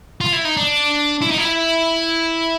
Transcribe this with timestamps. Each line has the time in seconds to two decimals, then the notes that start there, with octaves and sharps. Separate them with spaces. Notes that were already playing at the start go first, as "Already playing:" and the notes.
0.21 F4
0.33 E4
0.45 D#4
0.57 D4
1.22 E4
1.31 D#4
1.38 E4